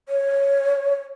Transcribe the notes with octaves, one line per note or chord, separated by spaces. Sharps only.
C#5